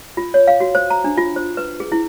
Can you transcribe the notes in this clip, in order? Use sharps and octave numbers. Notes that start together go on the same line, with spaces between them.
F4
C#5
F5
F#4
C5
A#5
D4
F4
C5
B4
G#4
E4